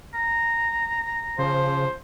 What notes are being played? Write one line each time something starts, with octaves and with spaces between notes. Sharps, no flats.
A#5
C#3 F3 C5